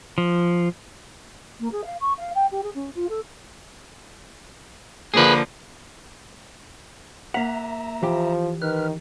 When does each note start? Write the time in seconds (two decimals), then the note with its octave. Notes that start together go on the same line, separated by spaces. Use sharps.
0.18 F3
1.59 A#3
1.71 G#4
1.84 F5
2.00 C#6
2.17 F5
2.35 G5
2.51 G4
2.63 G#4
2.74 C#4
2.94 F4
3.09 A4
5.14 D3 F3 A#3 G#4 B4
7.34 A#3 E5 F#5 A#5
8.03 E3 F3 G4
8.62 D#3 B4 F6